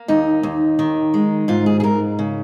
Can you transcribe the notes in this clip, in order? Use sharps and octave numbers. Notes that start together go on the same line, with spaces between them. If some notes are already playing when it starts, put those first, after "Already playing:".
Already playing: A#3
D#2 D#4
D#2
D#3
G#3
G#2 F4
G#4
G#4
G#2 A#4
C#3